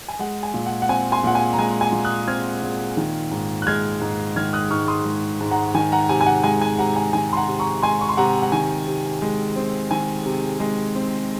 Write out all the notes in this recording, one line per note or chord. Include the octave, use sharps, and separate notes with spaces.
G#5
G#3 F#5
G#5
A#2
F#5
F#5
C4 G#5
G#5 C6
A#2 F#5
G#5
A#5
G#3 G#5
G#5
A#2
D#6 F#6
C4 F6 G#6
A#2
D#3
G#2
F#6
G#3 F6 G#6
G#2
D#3 F6 G#6
D#6 F#6
G#2 C#6 F6
C6 D#6
G#3
G#2
F#5 A#5
D#3 G#5
F#5 A#5
C3 G#5
G#5
F#5
G#3 G#5
G#5
C3 F#5 A#5
G#5
D#3 G#5
C6
F#5 A#5
C3
A#5 C#6
G#3 G#5 C6
C#6
C6
C3 F#5 A#5
F#5
D#3 G#5
C3
G#3
C4
D#3 G#5
C3
G#3
C4